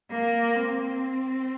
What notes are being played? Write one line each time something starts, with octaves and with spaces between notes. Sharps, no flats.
A#3
C4